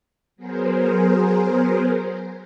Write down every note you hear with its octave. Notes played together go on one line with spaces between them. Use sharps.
F#3 B3 G#4 A#4 C5